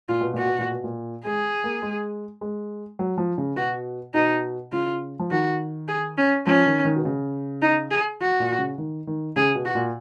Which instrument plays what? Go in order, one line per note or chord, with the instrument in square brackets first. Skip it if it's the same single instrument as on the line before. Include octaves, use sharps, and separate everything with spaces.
[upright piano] A#2 [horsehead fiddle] F4
[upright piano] B2
[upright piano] A#2 [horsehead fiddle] F#4
[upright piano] B2
A#2
B2
A#2
[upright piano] G#3 [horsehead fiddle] G#4
[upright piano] A#3
G#3
G#3
F#3
F3
C#3
[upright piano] B2 [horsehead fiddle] F#4
[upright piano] B2 [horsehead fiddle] D#4
[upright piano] C#3 [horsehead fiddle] F4
[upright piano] F3
[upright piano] D#3 [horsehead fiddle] F#4
[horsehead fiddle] G#4
C#4
[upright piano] F3 [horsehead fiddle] C#4
[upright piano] D#3
D#3
B2
C#3
[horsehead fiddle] D#4
G#4
F#4
[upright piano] A#2
C#3
D#3
D#3
[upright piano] C#3 [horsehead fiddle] G#4
[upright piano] B2
[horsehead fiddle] F#4
[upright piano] A#2